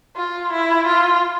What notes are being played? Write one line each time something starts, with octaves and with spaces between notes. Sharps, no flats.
F4
E4
F4